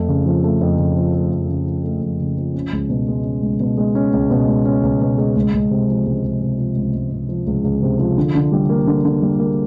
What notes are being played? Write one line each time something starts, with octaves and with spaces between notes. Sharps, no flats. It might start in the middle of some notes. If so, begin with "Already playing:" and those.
Already playing: F2 A3
C#3
F3
A3
F2
C#3
F3
A3
F2
C#3
F3
A3
F2
C#3
F3
C#4
C#2
B2
G#3
C#4
C#2
B2
G#3
C#4
C#2
B2
G#3
C#4
C#2
B2
G#3
C#2
C#2
C3
F3
C#2
C#2
C3
F3
C#2
C#2
C3
F3
C#2
C#2
C3
F3
D3
D3
G3
A#3
D3
D3
G3
A#3